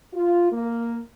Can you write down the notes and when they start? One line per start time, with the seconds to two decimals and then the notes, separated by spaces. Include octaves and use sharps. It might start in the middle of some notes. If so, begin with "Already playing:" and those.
0.14 F4
0.52 A#3